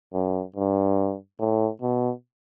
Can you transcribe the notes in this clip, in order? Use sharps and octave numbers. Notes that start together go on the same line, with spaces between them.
F#2
G2
A2
B2